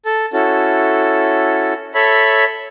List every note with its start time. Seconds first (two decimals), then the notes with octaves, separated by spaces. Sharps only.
0.05 A4
0.33 C#4 E4 F#4 A4
1.94 A4 C#5 E5 B5